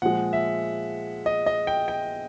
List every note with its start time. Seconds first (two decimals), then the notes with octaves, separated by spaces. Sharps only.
0.02 A#2 F3 G#3 F#5
0.33 E5
1.26 D#5
1.46 D#5
1.67 G5
1.88 G5